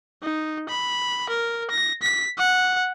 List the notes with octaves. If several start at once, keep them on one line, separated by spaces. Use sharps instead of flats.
D#4
B5
A#4
A#6
B6
F#5